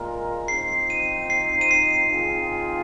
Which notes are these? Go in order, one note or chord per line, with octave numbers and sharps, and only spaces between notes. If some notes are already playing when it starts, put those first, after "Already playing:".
Already playing: A#2 G#3 F4 A#4
F3 C4 D#4 C7
D#7
C7
D#7
C7
D#3 C4 F4 G#4